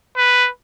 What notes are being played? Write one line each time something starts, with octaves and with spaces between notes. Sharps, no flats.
B4